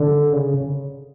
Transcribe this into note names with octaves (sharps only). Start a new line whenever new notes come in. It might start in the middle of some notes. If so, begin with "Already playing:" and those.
Already playing: D3
C#3